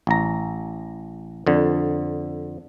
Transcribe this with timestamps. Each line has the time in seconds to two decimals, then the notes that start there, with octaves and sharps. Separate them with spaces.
0.07 A1 A#5
1.47 F2 D3